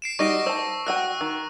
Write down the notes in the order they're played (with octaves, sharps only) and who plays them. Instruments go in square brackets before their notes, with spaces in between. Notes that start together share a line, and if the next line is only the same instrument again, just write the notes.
[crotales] C7 D7 E7
[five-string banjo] G3 D#4 F#4 [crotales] C#6 A#6 D7
[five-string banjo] C5 A5 [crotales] E6
[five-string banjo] F#4 F#5 G5 [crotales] C#6 E6 F#6
[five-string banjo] D#3